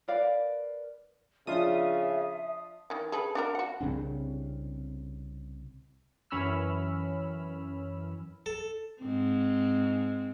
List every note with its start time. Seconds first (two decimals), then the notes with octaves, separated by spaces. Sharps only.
0.08 A#4 B4 D5 F5
1.47 C#3 F3 D4 F4 E5 D#6
2.90 D#3 E3
3.12 G#4 A4 B4
3.35 D4 F#4 A#4
3.55 F#4 F#5
3.81 C2 C#3 C4 D4
6.30 F#2 E3 C#4 B5 E6 F6
8.46 A4
9.01 G#2 C4